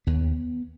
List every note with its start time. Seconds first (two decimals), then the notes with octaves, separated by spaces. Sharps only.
0.07 D#2 B3